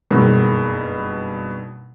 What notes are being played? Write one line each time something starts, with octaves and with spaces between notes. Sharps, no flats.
F#1 G2 B2 D#3